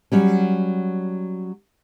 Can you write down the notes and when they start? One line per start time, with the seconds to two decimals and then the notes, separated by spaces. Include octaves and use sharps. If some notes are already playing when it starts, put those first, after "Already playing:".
0.12 F#3 G3 C#4